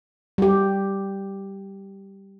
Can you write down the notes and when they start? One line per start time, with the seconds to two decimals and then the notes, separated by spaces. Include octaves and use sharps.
0.38 G3 G4